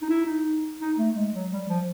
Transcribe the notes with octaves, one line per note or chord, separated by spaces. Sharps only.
D#4
E4
D#4
D#4
A3
G#3
F#3
G3
F3